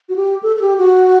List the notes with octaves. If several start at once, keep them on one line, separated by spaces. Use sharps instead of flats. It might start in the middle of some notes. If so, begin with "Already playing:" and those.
F#4
G4
A4
A4
G4
F#4